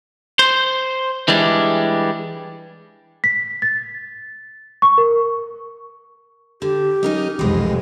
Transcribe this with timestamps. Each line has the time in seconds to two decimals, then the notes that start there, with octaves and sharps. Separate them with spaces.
0.39 C5
1.28 E3 G3 G#3 D4
3.24 B6
3.62 A6
4.82 C#6
4.98 A#4
6.62 D3 G4
7.03 F#3 C#4 D#4 A#4 D#5
7.39 F1 C2 F2 B2 E3 G3 G#3